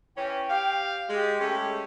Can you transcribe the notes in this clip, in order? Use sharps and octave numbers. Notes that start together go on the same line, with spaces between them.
E3 C#4 G5
G4 F5
G#3 G4
G#3 A3 C#4